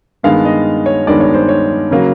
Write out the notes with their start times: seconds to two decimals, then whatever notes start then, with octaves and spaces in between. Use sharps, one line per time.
0.23 G2 D#3 G#3 B3 F5
0.45 D#5
0.86 C#5
1.07 G2 D#3 G#3 B3 D5
1.20 C#5
1.34 C5
1.49 C#5
1.91 C#3 F#3 A#3